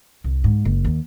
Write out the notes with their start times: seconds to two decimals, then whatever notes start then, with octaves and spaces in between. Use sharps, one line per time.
0.24 C2
0.44 G#2
0.65 F#1
0.85 D#2